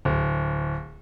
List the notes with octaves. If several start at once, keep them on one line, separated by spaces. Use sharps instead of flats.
D1